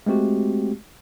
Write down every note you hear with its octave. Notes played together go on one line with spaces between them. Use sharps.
G#3 A3 C4 F#4 G4